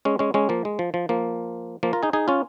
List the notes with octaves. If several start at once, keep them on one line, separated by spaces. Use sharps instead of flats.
G#3 C#4
G#3 C#4
G#3 C#4
F3 A#3
G#3
F3
F3
F3 A#3
F3 A#3
F4 A#4
D#4 G#4
D#4 G#4
C#4 F4